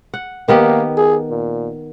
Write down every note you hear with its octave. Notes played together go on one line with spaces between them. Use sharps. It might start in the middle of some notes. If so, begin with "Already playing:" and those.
F#5
D#3 A#3 B3 G4
G#4
A#2